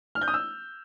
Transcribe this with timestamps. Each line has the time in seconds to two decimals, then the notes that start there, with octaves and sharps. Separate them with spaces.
0.15 F6
0.22 G6
0.28 D#6
0.34 E6